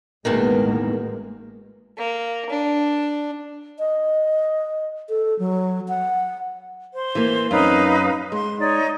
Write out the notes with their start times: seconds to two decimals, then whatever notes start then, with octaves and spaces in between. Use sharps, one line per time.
0.25 A1 E2 B2 D#3 G#3 A#3
1.97 A#3
2.50 D4
3.79 D#5
5.09 A4
5.39 F#3
5.88 F#5
6.94 C5
7.15 E3 A#3
7.51 F#2 C4 D#4 B4 F5
8.32 G#3 C6
8.58 D#4 C#5 D5